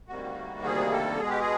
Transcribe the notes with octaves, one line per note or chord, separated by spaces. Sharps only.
D2 C3 D#3 G3 A#3 F#4
G#4
A4
B2 G#3 G#4
G4
G#4